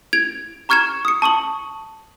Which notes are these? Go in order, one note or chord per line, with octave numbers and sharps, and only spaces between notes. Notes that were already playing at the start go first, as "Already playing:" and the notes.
G#6 D7 F7
A#5 C#6 F6 G#6 C#7 E7
D#6 C#7
A5 C#6 D#6 F#7